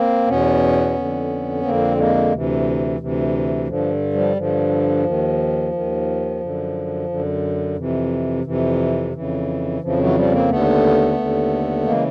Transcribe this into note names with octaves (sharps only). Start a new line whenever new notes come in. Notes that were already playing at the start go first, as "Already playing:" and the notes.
Already playing: A#3 C4
E2 B2 B3 C#4
F2 D3
F2 D3 A#3 C4
G#3 A#3
D2 C3 E3
D2 C3 E3
G2 D3 F3
F3 G3
G2 D3 F3
D#2 D#3
D#2 D#3
F#2 D3
F#2 D3
F2 C3 E3
F2 C3 E3
F2 C#3 E3
F2 C#3 E3 F3
E3 F#3
F3 G3
A#3 C4
D#2 D3 A3 B3
D#2 D3
C#3 E3 G#3 A#3